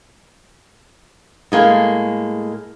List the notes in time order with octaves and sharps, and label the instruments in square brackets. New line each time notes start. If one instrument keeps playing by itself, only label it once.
[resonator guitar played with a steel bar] A2 G#3 A#3